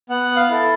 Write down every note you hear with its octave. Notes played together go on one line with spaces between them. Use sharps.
B3 F#5
F5
E4 A4